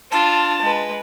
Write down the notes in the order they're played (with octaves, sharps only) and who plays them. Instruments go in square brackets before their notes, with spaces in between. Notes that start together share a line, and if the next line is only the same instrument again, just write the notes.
[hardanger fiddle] D4 F4 [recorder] A5
[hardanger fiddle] G#3 B4